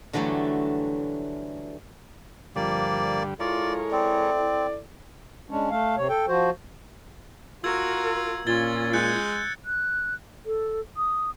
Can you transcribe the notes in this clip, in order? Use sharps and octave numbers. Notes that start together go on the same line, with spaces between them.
D3 E3 F#3 G3 A3
G2 D3 F3 G3 A#3 D5
G#3 E4 F4 A4 A#4 C#5 D5
C4 D5
G#3 C#4 D4
A3 F5
C3 C#5
A4 G5
F3 F#4 C5
F4 F#4 A#4 E6 G#6
A#2 C#4 F4 G#6 A6 G7
G#3 F#6 G6 C#7
F#6
A4
D#6